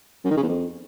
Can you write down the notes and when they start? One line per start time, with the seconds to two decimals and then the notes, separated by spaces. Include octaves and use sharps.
0.24 F#2
0.31 D#3
0.37 C#3
0.43 E2
0.49 F2